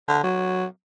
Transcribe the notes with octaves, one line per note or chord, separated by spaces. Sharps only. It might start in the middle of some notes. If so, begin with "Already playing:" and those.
D3
F#3